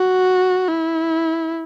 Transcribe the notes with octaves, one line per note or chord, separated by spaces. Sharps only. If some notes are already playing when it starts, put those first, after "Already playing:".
Already playing: F#4
E4